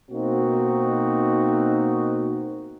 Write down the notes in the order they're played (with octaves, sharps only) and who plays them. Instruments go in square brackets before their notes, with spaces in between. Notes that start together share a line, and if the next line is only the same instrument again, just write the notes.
[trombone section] B2 A#3 C4 D#4 F#4